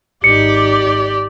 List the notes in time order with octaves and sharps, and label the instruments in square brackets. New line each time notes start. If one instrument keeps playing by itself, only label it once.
[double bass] G#1 D#4 [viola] G4 D5 [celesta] C#7